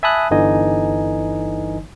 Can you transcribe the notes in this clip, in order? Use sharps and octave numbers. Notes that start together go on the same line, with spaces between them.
E5 G#5 A5 B5 D#6 F#6
G1 D3 E3 D#4 D#5 G#5